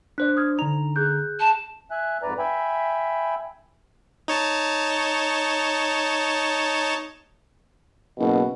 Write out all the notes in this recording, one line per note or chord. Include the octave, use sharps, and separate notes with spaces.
D4 C5 D5 F#6
D#6 F6 G#6
D3 D#4 A#5 F7
G#4 F#6 G6
A5
E5 G#5 F#6
F2 G#2 B4 D5 A#5
E5 G5 G#5 B5
D#4 C#5 A5
F#1 B2